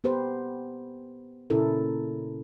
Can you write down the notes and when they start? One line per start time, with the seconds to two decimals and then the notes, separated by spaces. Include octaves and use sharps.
0.04 B3 G4 B4 C5
1.50 A#2 C#3 C#4 E4 A4 A#4